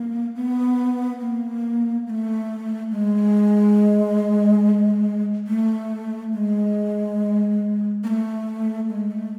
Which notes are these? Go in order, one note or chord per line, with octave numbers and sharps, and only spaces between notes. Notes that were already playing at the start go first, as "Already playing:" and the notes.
Already playing: A#3
B3
A#3
A#3
A3
G#3
A3
G#3
A#3
A3
G#3
A3